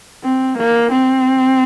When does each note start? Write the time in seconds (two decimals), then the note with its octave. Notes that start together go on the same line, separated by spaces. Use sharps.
0.24 C4
0.58 A#3
0.92 C4